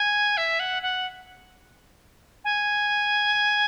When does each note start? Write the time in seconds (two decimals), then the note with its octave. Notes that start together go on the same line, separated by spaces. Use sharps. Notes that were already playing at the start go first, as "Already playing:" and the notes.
Already playing: G#5
0.37 E5
0.59 F#5
0.82 F#5
2.44 G#5